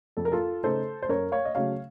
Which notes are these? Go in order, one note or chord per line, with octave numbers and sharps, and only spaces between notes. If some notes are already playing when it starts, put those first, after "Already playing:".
F2 A4
A#4
F4 A4
C#3 A3 D#4 A4 C5
C5
F#2 A#4 C#5
C#5 F5
D#5
C#3 F#3 A3 C#5 F5